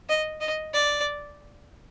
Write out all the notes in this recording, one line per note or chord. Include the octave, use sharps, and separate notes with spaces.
D#5
D#5
D5